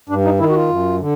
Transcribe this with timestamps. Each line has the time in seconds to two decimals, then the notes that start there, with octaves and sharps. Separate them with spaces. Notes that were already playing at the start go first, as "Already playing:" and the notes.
0.09 G2 D4
0.25 D#4
0.39 D#3 E4
0.50 F#4
0.55 F4
0.69 F#2
1.00 D3